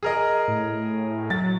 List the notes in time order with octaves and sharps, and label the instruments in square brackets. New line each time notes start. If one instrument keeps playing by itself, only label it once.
[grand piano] G#4 A#4 D#5
[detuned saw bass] A2
[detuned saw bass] F#3 [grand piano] A6